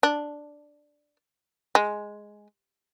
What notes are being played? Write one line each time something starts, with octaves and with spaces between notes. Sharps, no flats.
D4
G#3